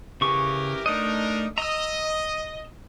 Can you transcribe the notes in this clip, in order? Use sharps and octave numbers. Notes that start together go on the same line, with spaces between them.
C#3 E3 G4 A#4 C#6
A3 D4 D#4 A#4 D#5
D#5 A#5 E6